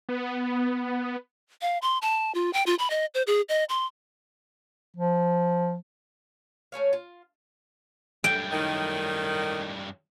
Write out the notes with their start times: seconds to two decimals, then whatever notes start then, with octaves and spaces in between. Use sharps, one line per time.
0.09 B3
1.62 F5
1.82 C6
2.02 A5
2.35 F4
2.53 G5
2.66 F4
2.79 B5
2.90 D#5
3.15 C5
3.27 G#4
3.49 D#5
3.69 C6
4.97 F3
6.72 A3 C#4 C#5 F5
6.93 F4
8.24 F#2 G3 G5
8.52 A2 D#3